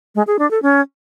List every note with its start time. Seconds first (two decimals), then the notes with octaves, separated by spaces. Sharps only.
0.15 G#3
0.27 G#4
0.39 D4
0.51 A4
0.62 C#4